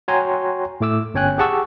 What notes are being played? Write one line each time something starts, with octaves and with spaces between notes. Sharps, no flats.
F#4 C#5 G5 G#5 A#5 C6
A2 A3 D6 E6
G1 C#4 C#5 G5 G#5 F#6
G4 G#4 F#5 A5 C#6 E6